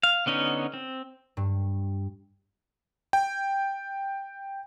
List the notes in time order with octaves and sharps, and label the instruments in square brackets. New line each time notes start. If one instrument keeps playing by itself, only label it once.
[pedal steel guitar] F5
D3 B3 C#4 D#4
C4
[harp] G2
[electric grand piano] G5